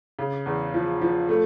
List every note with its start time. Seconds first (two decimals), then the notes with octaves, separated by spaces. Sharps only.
0.19 C#3
0.46 E2
0.74 F3
1.02 F3
1.29 A3